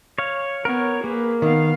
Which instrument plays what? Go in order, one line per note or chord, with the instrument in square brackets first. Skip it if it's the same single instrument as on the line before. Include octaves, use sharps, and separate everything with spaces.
[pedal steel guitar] C#5 F5
[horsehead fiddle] B3 [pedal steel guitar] A#4 C#5
[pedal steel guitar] A#3 [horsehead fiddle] G#4 B4
[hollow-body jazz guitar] D#3 [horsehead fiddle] B3 F5